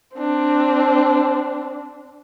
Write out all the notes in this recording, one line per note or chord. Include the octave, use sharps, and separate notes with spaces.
C4 D4